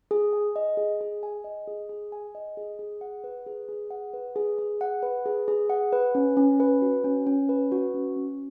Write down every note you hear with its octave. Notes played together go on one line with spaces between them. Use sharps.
G#4
G#5
D#5
G#4
G#4
G#5
D#5
G#4
G#4
G#5
D#5
G#4
G#4
F#5
B4
G#4
G#4
F#5
B4
G#4
G#4
F#5
B4
G#4
G#4
F#5
B4
C#4
C#4
B4
F#4
C#4
C#4
B4
F#4
C#4
C#4